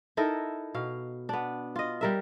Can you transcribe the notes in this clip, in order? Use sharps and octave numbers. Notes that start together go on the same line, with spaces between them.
D#4 E4 A4 A#4
B2 F5
B3 D4
F4 D#5
G3 A#4 E5